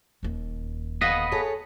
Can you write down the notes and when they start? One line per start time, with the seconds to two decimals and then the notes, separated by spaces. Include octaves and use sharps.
0.23 D#1 D#2
1.01 D2 B3 B4 D#5 F5
1.32 G#4 A4 C#5